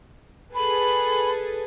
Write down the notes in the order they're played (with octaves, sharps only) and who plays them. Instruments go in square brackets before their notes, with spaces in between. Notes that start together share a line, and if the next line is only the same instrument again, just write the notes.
[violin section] G#4 A4 B4 [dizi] B5